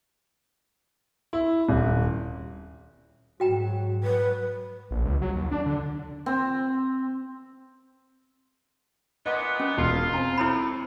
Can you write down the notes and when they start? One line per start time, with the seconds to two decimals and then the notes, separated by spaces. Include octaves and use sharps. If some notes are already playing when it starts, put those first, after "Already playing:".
1.33 E4
1.69 D#1
3.40 G#2 F#3 F#4 G5 A#5
4.03 F#3 B4
4.91 A#1
5.05 C#2
5.21 F#3
5.35 D#2
5.51 D4
5.66 D3
6.26 C4
9.26 A#2 B3 D#5
9.60 C#4
9.77 E1 F4
10.13 C4 G#5 A#5
10.38 A2 E4 B5